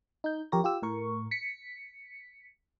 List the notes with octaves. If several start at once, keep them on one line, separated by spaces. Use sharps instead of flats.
D#4 G6
F2 G4 A#4 C#5 A#6
F4 G4 E6
A2 A#4 C#6
B6 C#7